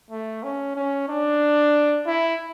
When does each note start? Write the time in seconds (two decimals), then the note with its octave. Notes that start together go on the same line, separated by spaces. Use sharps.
0.11 A3
0.43 C#4
0.76 C#4
1.09 D4
2.07 E4